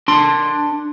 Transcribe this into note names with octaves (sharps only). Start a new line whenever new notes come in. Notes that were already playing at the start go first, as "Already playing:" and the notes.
D4 C6